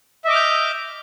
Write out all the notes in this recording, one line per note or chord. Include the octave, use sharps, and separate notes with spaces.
D#5 E5 D6 F6 G6